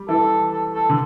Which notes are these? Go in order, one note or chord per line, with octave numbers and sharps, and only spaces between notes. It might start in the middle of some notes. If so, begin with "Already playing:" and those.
Already playing: G3
E3 A4
A4
A4
D3